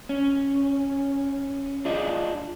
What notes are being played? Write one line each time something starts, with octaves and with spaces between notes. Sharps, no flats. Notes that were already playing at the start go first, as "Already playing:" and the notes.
C#4
D4 F4 G#4 D5 D#5